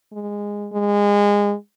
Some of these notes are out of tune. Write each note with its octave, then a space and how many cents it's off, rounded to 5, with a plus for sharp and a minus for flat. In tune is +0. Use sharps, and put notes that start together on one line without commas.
G#3 -15
G#3 -25